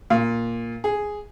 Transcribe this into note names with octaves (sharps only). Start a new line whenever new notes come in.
A#2
G#4